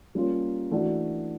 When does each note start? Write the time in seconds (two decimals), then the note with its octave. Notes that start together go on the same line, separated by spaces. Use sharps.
0.15 G3 A#3 C#4 F4
0.71 E3 A3 D4 F#4